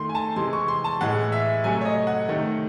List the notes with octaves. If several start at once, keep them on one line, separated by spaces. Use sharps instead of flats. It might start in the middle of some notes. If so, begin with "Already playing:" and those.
Already playing: D#3 A3 C6
G#5
A5
C3 E3 G#3 C6
C#6
C6
A5
A2 E3 G#3 F#5
E5
C3 F#3 A3 G#5
C#5
D#5
F#5
C3 D#3 A3